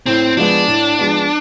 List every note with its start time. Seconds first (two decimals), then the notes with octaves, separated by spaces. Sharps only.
0.06 A2 C4
0.37 F3 G#3 B3 D4
0.68 A2
0.99 F3 G#3 B3